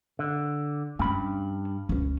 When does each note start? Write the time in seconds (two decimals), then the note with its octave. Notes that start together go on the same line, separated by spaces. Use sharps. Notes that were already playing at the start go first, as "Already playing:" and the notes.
0.19 D3
0.99 G2 C#4 D4 B5
1.89 C#2 C#4